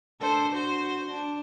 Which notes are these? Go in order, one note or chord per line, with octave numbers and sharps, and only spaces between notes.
D4 A4 C5
F#4 C5
D4